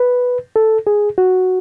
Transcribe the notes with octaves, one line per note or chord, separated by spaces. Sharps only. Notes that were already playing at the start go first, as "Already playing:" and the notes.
Already playing: B4
A4
G#4
F#4